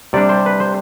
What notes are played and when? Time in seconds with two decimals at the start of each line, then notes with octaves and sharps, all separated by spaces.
0.13 C3 G3 D4 D5
0.29 C5
0.46 B4
0.60 C5